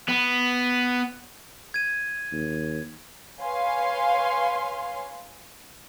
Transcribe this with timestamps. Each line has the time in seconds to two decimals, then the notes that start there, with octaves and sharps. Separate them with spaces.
0.08 B3
1.74 G#6 D#7
2.32 D#2
3.40 B4 C#5 F5 G#5 C6